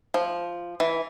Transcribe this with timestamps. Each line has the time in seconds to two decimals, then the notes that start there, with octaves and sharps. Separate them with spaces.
0.14 F3
0.80 E3